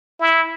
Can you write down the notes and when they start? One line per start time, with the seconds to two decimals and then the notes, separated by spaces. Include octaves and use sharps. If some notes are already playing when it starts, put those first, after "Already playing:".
0.20 E4